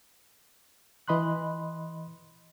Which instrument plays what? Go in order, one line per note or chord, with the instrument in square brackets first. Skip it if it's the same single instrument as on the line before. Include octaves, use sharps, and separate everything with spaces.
[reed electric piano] E3 D#5 B5 C6 F#6